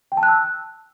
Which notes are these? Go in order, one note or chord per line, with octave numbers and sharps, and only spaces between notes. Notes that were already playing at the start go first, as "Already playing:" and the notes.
G5
A5
F#6
E6